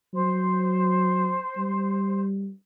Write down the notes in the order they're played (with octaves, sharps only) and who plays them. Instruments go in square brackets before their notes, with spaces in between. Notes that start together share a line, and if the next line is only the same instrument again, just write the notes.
[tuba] F#3 [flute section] C5
[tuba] G3